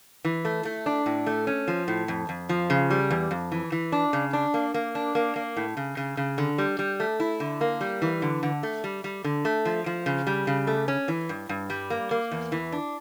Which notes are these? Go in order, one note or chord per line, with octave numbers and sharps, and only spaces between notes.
E3
A3
A3
D4
A2
A3
C#4
F3
A2
F2
F2
F3
C#3
G3
E2
F2
E3
E3
D4
C#3
D4
A#3
A#3
D4
A#3
A#3
A2
C#3
C#3
C#3
D3
G3
G3
A3
E4
D3
A#3
G3
E3
D3
D3
A3
G3
G3
D3
A3
F3
F3
C#3
G3
C#3
A3
C#4
E3
G2
G2
G3
A#3
A#3
E2
E3
D4